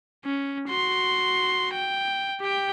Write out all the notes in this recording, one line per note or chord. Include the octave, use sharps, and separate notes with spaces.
C#4
F#4 C6
G5
G4 G5